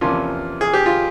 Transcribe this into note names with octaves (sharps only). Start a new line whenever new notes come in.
E2 C3 F3 A#3 C#4 F4
G#4
G4
F4